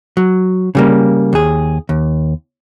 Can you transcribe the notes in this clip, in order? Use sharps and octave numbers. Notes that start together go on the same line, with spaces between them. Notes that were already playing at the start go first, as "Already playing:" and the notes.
F#3
C#3 G3 A#3
D#2 G#4
D#2